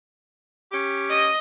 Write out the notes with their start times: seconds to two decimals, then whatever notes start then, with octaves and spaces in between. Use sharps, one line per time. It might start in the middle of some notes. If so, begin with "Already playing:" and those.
0.72 C#4 G4
1.09 D#5